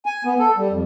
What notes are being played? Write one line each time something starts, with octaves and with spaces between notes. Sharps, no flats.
G#5
B3
A4
G3
F2